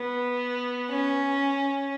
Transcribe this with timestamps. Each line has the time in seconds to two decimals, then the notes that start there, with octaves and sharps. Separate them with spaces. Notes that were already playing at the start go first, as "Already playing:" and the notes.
Already playing: B3
0.90 C#4